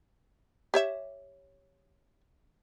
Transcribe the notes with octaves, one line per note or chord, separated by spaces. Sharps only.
G4 C#5 E5